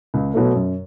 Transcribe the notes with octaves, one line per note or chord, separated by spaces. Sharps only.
C#2
B2 F#3 A3
F#2